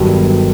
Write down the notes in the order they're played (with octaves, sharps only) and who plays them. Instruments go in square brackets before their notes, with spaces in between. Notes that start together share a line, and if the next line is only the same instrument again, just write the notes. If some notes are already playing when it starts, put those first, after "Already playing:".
Already playing: [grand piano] G1 G2 D#3 F#3